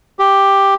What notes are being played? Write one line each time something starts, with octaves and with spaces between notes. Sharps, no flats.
G4